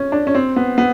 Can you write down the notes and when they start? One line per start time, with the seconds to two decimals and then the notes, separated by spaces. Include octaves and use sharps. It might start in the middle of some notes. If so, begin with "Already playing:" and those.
Already playing: C#4
0.12 D4
0.27 C#4
0.35 C4
0.56 B3
0.78 B3